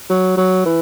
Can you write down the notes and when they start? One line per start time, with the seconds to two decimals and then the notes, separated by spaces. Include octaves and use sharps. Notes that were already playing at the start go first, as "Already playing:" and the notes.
0.10 F#3
0.37 F#3
0.66 E3